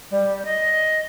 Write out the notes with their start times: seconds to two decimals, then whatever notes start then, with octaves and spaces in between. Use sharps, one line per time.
0.11 G3
0.45 D#5